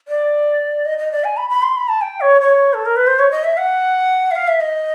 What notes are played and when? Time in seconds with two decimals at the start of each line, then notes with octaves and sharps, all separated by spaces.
0.08 D5
0.85 D#5
0.98 D#5
1.12 D5
1.24 G#5
1.37 B5
1.50 B5
1.62 C6
1.76 B5
1.88 A5
2.01 G5
2.21 C#5
2.41 C#5
2.73 A4
2.85 A#4
2.96 B4
3.07 C5
3.19 C#5
3.31 D#5
3.44 E5
3.57 F#5
4.31 E5
4.35 F5
4.48 E5
4.61 D#5